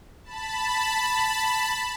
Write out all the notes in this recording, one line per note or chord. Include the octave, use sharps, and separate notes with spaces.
A5 B5